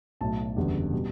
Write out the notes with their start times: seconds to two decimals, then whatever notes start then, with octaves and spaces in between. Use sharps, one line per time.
0.21 B1 A2 F#3 A5
0.56 F#1 E2 D3 G3
0.93 B2 G3